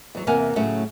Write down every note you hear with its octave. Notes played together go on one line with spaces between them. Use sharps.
E2 F#3
E2 C3 A#3 F5 F#5 G#5
A2 C#3 F#3 A3 C#4